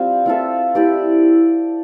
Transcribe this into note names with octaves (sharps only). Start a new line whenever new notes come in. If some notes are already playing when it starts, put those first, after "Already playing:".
Already playing: G3 C4 F4
C4 F4 A4 E5
E4 G4 D5